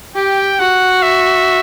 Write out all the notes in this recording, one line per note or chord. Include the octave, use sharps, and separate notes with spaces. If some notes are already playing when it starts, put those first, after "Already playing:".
G4 G5
F#4 F#5
E5